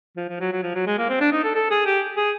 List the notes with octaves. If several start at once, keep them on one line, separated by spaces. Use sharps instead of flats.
F3
F3
F#3
F#3
F3
F#3
G#3
A#3
C4
D4
D#4
A4
A4
G#4
G4
G#4